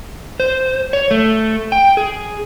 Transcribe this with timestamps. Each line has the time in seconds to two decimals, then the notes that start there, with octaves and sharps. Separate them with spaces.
0.40 C5
0.93 C#5
1.11 A3
1.72 G5
1.97 G#4